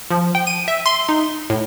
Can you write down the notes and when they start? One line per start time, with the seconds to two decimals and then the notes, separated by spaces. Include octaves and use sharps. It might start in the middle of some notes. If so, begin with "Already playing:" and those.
0.11 F3
0.35 G5
0.47 D#7
0.68 E5
0.86 C6
1.09 D#4
1.50 A2